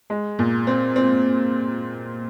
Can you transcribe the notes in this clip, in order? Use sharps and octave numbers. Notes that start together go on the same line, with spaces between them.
G#3
A#2
C4
C4